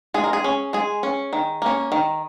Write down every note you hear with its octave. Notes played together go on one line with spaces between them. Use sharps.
G#3 G#4
A#4
G#4
C#4
G#3 G#4
C#4
D#3
A#3 C#4
D#3